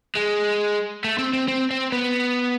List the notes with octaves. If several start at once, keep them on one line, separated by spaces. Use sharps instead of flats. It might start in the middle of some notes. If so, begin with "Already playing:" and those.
G#3
A3
C4
C4
C4
C4
B3